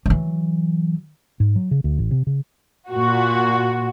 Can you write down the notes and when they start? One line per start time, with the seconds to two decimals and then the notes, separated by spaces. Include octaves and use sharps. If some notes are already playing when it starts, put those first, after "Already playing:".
0.06 E3 F#3
1.40 G#2
1.56 F#3
1.71 C#3
1.84 D2
1.98 A1
2.11 C3
2.27 C#3
2.91 A#2 F#4